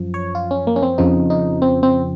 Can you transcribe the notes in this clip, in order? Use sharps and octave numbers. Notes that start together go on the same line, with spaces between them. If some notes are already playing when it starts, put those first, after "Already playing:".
Already playing: F#2 F3
C#5
F4
C#4
A#3
C#4
C4
F2 C#3 F3 D#4
D#4
C4
C4